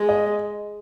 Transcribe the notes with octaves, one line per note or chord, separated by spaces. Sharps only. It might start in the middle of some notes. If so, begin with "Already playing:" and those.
Already playing: G#3
D#5